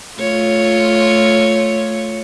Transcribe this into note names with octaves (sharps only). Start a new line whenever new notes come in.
A3 F4 C#5